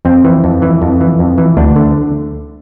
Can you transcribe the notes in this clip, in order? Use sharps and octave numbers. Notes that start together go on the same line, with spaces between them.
F2 C4
E3
F2
E3
F2
E3
F2
E3
D2 D4
D3